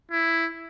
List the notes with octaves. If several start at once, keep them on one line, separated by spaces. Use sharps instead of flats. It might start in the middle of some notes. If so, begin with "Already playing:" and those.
E4